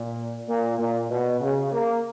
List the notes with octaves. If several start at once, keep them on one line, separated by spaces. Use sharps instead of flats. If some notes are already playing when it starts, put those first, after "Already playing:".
Already playing: A#2
A#2
A#2
B2
C#3
A#3